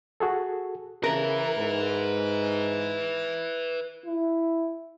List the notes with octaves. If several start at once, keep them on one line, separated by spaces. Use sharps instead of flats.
F#4 G#4 A4
C#3 A#4 B4 E5
G#2
E4